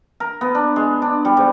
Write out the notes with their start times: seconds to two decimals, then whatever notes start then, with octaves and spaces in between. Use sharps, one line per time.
0.20 A#4
0.41 B3
0.55 D4
0.76 G#3
1.02 D4
1.25 G3
1.37 G#2